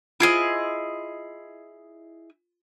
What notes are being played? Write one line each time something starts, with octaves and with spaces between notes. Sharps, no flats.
E4 F4 G#4 C5 D#5